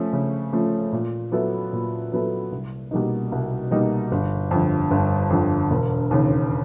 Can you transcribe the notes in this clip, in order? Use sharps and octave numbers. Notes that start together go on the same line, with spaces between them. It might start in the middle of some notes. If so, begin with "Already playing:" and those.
Already playing: F3 A3 C#4
C#3
F3 A3 C#4
A#2
F#3 B3 E4 A4
A#2
F#3 B3 E4 A4
C2
B2 G3 A#3 D#4
C2
B2 G3 A#3 D#4
G1
F2 D3
G1
F2 D3
E1
D#2 C#3